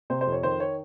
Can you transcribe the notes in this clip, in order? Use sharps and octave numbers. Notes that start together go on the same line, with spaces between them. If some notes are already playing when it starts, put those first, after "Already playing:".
C3 C5
C5
F2
C#5
D#3 C5
C#5